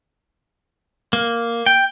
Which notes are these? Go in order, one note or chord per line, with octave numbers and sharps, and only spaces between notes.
A#3
G5